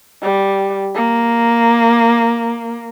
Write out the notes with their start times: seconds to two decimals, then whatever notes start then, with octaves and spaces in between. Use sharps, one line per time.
0.23 G3
0.95 A#3